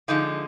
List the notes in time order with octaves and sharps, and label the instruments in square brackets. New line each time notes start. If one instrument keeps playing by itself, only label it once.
[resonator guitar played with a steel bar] D3 F3 G#3 D#4